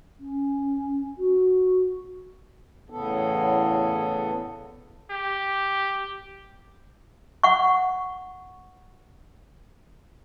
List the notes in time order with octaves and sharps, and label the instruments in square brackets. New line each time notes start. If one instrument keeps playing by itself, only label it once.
[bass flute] C#4
F#4
[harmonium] E2 A2 C#3 B3 A4
[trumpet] G4
[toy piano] F#5 C#6